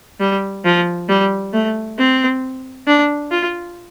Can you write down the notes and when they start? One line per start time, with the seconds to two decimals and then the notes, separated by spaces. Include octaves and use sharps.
0.20 G3
0.65 F3
1.09 G3
1.53 A3
1.98 C4
2.87 D4
3.31 F4